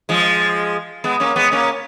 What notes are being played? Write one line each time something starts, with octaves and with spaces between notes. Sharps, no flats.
F3 G#3
G#3 B3
A#3 C#4
G#3 B3
A#3 C#4